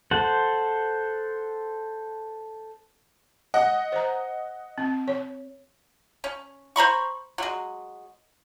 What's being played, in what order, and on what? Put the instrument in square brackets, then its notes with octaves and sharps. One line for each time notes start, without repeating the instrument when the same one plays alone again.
[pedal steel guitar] A4 C5 F#5
[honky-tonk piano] D#5 F#5
[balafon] C5 A#5
C4
C#5
[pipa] C#4
C5 A#5 B5 C#6
F#3 G#3